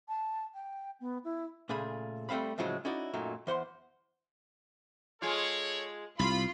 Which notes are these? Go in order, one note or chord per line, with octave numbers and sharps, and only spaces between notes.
A5
G5
B3
E4
A#2 C#3 A3 G#4 B5
G3 A3 C4 F5 B5
A2 C#3 F3 F#3 G#3
C#4 D#4 E4 F#4 D5
F#2 A#2 F#3 A3 D#4
E2 C5 F#5 C6
G#3 F4 A4 C#5
C2 F4 B5